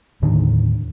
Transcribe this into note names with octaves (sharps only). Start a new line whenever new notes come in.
D#2 A2 D3 D#3